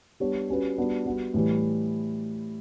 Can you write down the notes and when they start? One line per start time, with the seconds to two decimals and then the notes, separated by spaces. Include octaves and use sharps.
0.20 G3 B3 D4 G4 C#5
0.49 G3 C#4 F#4 B4
0.78 G3 B3 D4 F#4
1.06 G3 B3 F#4
1.34 A2 E3 G3